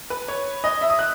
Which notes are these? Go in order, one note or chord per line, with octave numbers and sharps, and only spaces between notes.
B4
C#5
D#5
E5
D#6
F#6